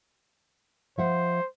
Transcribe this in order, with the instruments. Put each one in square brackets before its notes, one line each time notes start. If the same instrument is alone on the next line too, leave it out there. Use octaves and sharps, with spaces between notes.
[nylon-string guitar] F3 E5 F#5 [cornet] C5